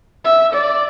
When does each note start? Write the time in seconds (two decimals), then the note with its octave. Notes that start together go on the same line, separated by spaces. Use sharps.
0.25 E5
0.53 D5